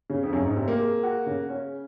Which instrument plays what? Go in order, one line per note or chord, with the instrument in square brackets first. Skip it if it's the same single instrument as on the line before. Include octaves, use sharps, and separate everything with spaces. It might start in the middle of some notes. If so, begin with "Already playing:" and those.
[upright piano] C#3
[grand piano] F2
[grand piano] F#2 [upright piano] C#3
[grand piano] G#2
[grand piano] C3 [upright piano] C4
[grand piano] A#3
[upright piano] G#3
F#4
C#3
C#4